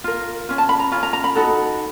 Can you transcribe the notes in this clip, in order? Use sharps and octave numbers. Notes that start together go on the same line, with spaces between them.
F4 A#4
C#4 F4
A5
B5
A#5
C#4 F4
A#5
A#5
B5
D#4 F#4 A4